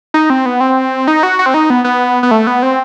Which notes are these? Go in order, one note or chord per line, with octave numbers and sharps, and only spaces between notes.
D#4
C4
B3
C4
D#4
F#4
F#4
C4
D#4
B3
B3
B3
A3
B3
C4